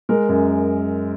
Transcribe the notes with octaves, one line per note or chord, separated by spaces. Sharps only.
G#3 A#4
F#2